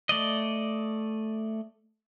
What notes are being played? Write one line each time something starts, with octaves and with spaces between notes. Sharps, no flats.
A3 D5 D#5